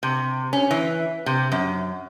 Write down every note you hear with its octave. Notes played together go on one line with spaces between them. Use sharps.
C3
C#4
E3
C3
F#2